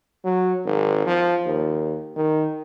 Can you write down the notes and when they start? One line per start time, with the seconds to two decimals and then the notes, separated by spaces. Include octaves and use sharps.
0.24 F#3
0.65 G#1
1.06 F3
1.45 D#2
2.16 D#3